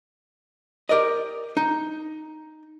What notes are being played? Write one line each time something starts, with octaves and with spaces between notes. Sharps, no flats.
G4 A#4 D5 D#5
D#4